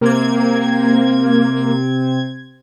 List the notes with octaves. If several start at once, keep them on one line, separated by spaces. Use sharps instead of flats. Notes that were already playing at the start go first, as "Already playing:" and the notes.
C3 A#3 C4 G#6